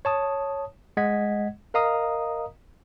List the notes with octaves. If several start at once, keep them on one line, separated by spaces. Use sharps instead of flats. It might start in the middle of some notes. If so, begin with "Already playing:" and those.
C#5 A5 D#6
G#3 D#5 F#5 G#6 B6
A#4 D#5 F5 A#5 D#6